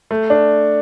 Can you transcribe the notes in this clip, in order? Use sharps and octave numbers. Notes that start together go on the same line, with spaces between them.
A3
D4